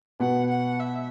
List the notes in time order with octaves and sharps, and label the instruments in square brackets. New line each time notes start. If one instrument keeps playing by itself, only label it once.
[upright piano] B2 B3 [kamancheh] F#5
[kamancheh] F#5
E5